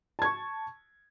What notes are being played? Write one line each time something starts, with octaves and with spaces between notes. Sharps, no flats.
A5 C#6 G#6